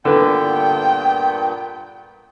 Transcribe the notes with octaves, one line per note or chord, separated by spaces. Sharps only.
G2 A#2 D3 B3 B4 G5